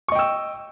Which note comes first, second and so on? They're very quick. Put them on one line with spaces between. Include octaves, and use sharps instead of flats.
C#6 D#5 G5 E6